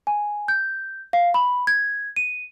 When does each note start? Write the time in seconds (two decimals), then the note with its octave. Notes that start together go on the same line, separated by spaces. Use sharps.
0.07 G#5
0.48 G6
1.13 F5
1.34 B5
1.67 G#6
2.16 D#7